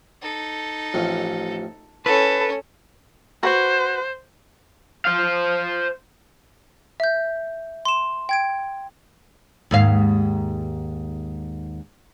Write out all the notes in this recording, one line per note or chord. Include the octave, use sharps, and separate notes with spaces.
D#4 A4
A1 F2
C#4 E4 A4 B4
F#4 B4 C5
C5 F5
E5 G6
C6 E7
G5 G#6 D7
D#2 G#2 F5